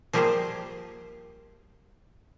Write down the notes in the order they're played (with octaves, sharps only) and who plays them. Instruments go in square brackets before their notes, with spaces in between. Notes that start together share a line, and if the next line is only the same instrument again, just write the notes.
[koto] F3 G3 A#3 G4 G#4 C5